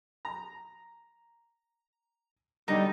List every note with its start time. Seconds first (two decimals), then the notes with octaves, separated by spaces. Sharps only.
0.25 A#5
2.68 B2 D3 G3 D#4